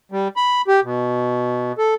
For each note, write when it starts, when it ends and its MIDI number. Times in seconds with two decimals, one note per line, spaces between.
0.12 0.28 55
0.36 0.62 83
0.68 0.80 67
0.83 1.72 47
1.78 1.94 69